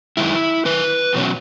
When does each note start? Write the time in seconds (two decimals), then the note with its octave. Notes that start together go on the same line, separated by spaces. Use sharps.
0.17 F#2 D#3 G#3 E4
0.65 F#2 D#3 B4
1.13 E2 B2 F#3 C#4